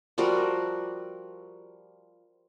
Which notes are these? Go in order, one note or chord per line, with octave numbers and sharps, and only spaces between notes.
F3 G3 F#4 A#4